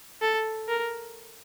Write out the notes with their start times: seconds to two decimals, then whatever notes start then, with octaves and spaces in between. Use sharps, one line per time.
0.22 A4
0.68 A#4